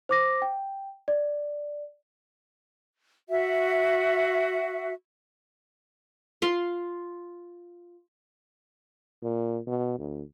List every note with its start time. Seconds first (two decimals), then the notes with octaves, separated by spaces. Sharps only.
0.09 C5 D6 A#6
0.42 G5
1.08 D5
3.29 F#4 E5
6.42 F4 F5 C6
9.23 A#2
9.67 B2
9.98 D2